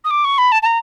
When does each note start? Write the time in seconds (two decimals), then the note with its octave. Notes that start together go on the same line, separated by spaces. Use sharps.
0.04 D#6
0.10 D6
0.25 C#6
0.38 B5
0.52 A5
0.62 A5
0.66 A#5